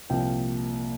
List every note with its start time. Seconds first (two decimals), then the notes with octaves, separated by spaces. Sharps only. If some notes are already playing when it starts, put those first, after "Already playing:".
0.10 C2 A#2 F3 A#3 G5